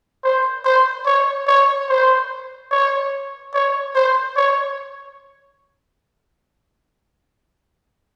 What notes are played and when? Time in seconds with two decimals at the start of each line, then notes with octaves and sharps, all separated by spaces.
0.24 C5
0.65 C5
1.06 C#5
1.47 C#5
1.89 C5
2.71 C#5
3.54 C#5
3.95 C5
4.36 C#5